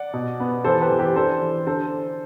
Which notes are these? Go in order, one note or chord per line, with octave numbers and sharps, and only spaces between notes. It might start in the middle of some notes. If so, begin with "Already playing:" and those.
Already playing: D5 F#5
B2
B3
E3 A4 C5
G4 B4
E3
G4 B4
D4 A4 C5
E3
D3 A4 C5